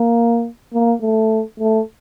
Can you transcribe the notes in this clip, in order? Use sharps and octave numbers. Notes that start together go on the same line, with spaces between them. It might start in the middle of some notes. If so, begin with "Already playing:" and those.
Already playing: A#3
A#3
A3
A3